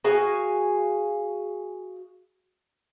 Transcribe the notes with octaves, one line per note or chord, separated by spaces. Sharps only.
F#4 G#4 F5 G#5